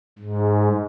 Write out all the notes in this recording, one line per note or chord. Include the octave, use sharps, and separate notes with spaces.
G#2